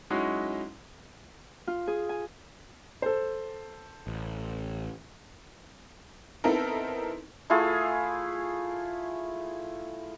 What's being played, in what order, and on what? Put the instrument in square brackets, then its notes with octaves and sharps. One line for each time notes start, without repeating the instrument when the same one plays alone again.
[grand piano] F#3 G#3 C#4 D#4 E4 F#4
[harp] F4
G#4
G#5
[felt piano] A4 C5
[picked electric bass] A1
[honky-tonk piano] B3 C4 D#4 E4 A4 A#4
[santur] A3 E4 F4 G#4